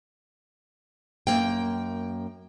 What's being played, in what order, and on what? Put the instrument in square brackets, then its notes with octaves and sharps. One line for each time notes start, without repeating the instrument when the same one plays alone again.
[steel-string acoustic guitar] F#2 A#3 G5